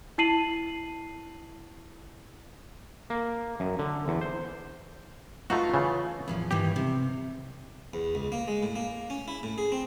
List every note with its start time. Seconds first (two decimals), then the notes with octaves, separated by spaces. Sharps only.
0.18 E4 A5 C7 D#7 F#7
3.10 A#3
3.60 F#2
3.79 D3
4.08 E2
4.21 C5
5.50 A3 D#4 F4 F#4 B4
5.74 C#3 E3 A3
6.28 E2 A2 F3
6.51 G2 D#3 E3 G4
6.76 C3
7.94 E2
8.15 C#2
8.32 A#3
8.48 G#3
8.63 A2
8.76 A#3
9.10 C#4
9.28 E4
9.43 A2
9.58 G#4
9.72 C4